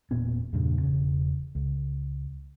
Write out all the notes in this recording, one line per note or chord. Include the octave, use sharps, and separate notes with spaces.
E1 A#2 B3 C#4
E2 G2 A#2 C#3
E1 C#3 C#4
C#2